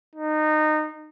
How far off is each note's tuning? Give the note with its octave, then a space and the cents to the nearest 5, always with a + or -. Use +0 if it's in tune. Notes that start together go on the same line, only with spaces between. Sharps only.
D#4 -20